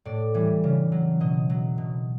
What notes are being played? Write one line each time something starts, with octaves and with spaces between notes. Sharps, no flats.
A2 D5
E3 G3
C#3
F#3
B2 D#5
F#3
B2